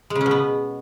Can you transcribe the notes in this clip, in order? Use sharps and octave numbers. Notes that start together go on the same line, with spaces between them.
G#3
C#3
C#4
B2
B3